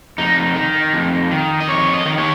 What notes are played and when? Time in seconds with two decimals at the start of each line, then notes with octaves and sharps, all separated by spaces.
0.18 F2 D#4
0.56 D#3
0.93 F2
1.31 D#3
1.61 D#5
1.68 F2 C#5
1.94 D#5
2.06 D#3
2.18 C#5